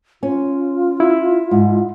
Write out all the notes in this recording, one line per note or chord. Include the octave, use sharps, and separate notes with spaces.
C#4 F4
E4
G#2